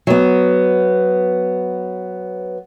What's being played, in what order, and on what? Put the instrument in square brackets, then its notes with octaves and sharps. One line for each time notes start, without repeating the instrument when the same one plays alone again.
[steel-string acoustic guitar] F#3 B3